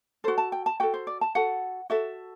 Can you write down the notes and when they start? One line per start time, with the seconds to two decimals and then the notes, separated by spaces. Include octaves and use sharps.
0.24 F#4 A4 C5
0.38 A5
0.52 G5
0.66 A5
0.80 F#4 A4 G5
0.94 C5
1.07 D5
1.21 A5
1.35 F#4 A4 F#5
1.90 F#4 A4 E5